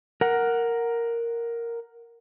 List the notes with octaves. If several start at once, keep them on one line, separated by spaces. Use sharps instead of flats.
A#4 F#5